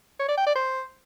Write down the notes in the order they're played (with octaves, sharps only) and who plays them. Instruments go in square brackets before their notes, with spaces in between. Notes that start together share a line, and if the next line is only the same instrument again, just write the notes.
[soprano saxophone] C#5
D5
G5
D5
C5